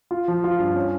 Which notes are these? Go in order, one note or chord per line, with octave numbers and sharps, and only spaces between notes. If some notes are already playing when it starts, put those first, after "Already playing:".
F4
F3
F4
G2
C#4